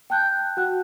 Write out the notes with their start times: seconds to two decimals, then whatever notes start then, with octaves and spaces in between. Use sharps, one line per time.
0.10 G5 A5 F#6 G6
0.57 F#4 F#5 F#6